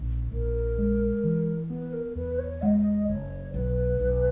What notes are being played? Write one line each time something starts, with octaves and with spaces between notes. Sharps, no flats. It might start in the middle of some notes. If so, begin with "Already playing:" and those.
Already playing: A#1
A#1 A#4
G#3
E3
B3 B4
A#4
E2 B4
C#5
G#3 D#5 F#5
F#1 C#5
B1 B4
B1